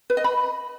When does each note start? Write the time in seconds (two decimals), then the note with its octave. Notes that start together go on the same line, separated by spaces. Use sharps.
0.10 B4
0.17 D#5
0.24 B5